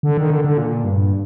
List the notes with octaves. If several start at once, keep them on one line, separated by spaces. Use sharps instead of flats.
D3
D#3
D3
D3
A#2
G2